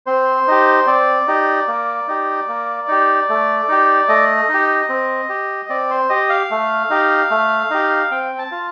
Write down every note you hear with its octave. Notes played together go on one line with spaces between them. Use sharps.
C4 C5
D#4 G4
C4 D5
D#4 G4
A#3
D#4 G4
A#3
D#4 G4
A3
D#4 G4
A3 D#5
D#4
G4
C4
G4
C4 D5
C5
G4 D#5
F5
A3
D#4 G4
A3
D#4 G4
C4 G5
A5
F4